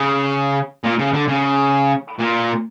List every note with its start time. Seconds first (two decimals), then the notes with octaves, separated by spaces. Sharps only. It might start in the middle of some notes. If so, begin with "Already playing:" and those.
Already playing: C#3
0.84 A#2
0.99 C#3
1.13 D3
1.28 C#3
2.19 A#2